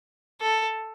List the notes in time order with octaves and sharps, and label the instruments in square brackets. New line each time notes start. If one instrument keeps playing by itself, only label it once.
[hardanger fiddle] A4